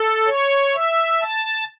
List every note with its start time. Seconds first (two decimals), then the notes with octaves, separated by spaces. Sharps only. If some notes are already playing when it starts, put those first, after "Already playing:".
Already playing: A4
0.26 C#5
0.74 E5
1.21 A5